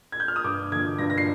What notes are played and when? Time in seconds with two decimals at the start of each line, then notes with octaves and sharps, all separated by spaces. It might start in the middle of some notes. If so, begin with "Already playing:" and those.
0.12 G#6
0.20 G6
0.28 F6
0.36 D#6
0.44 G2 D6
0.71 D3 F3 G#6
0.98 G2 A#6
1.10 A#6
1.18 C7